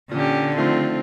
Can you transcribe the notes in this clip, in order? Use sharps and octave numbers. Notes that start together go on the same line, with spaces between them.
A#2 D3 C#4 G4
D#3 F3 A3 C4 F4